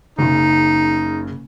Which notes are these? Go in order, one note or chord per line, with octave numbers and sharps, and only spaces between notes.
F#1 C#3 D#4